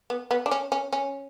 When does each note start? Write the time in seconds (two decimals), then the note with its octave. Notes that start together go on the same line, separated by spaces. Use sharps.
0.10 B3
0.31 B3
0.46 D4
0.51 C#4
0.72 C#4
0.93 C#4